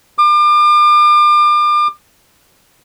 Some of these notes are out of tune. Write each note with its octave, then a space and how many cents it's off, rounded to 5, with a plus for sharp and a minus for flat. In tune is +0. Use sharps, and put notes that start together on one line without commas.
D6 +35